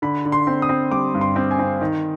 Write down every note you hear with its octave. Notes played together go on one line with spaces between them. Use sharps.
D3 B5
D3
C6
C4
D#6
C4
G3 D6
G2
C6
C4
G#5
C4
D#3